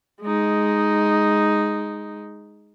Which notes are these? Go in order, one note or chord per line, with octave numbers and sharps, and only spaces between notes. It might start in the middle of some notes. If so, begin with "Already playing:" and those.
G#3 D#4